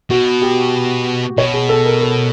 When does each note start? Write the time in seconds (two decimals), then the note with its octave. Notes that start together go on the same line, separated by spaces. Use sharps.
0.10 B2 F#4
0.42 G4
1.37 B2 C#5
1.54 G#4
1.69 A4
1.86 A#4
2.01 A4